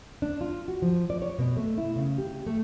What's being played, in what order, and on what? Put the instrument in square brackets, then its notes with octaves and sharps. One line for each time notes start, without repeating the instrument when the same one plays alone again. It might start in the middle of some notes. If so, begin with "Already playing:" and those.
[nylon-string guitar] D4
F4
F#4
F3
D5
C#5
B2
A3
E4
C#3
G4
A3